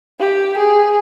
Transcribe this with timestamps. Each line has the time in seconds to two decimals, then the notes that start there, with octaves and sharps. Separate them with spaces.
0.20 G4
0.58 G#4